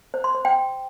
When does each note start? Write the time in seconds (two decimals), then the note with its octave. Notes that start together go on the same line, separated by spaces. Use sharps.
0.14 C5
0.24 C6
0.34 C5
0.45 G5